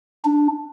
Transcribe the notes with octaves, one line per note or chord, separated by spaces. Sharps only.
D4